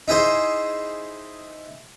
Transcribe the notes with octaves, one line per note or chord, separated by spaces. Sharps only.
D#4 E4 G#4 C5